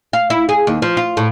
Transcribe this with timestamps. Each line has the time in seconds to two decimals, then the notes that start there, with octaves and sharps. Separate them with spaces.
0.13 F5
0.30 E4
0.49 G#4
0.67 D#2
0.82 F3
0.97 F4
1.17 A2